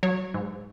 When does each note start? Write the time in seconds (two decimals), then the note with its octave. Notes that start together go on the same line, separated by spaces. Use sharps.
0.03 F#3 C#5
0.34 G#2